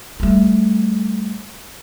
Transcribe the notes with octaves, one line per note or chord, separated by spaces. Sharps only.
G3 A3